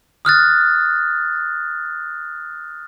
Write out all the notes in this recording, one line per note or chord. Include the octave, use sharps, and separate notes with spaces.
D#6 F6 F#6 A6